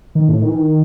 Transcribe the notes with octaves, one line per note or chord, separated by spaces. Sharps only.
D#3
A2
D#3
E3
D#3